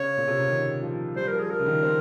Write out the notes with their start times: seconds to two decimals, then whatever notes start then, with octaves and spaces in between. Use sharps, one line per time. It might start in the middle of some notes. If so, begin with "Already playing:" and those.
Already playing: C#3 C#5
0.17 A#2
0.28 C3
0.39 C#3
0.49 D#3
0.82 F3
1.15 G3 C5
1.27 A#4
1.33 F3
1.40 G#4
1.49 F3 A#4
1.59 C#3
1.66 D#3
1.83 C4